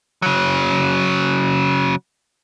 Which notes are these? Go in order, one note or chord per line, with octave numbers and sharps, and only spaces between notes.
C#3 F#3